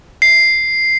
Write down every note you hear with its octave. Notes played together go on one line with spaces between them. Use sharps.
C7